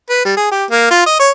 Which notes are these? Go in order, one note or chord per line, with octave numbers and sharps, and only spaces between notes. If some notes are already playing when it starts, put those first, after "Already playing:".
B4
G3
G#4
G4
A#3
F4
D#5
C#5